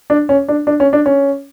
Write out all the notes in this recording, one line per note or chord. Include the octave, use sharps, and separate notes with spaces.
D4
C#4
D4
D4
C#4
D4
C#4